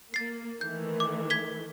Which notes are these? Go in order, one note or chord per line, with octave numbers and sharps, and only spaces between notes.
A#3 A6 C7
D#3 E3 A3 G6
D6
G#6 B6 G7